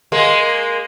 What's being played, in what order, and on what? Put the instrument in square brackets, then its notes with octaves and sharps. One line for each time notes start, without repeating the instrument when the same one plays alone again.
[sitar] G#3 A#3